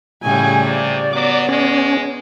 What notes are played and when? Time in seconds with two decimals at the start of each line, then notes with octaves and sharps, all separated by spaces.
0.23 A2 C#3 G3 G#5
0.62 C3 D5
1.13 F#3 B3 D6
1.49 G#3 C#4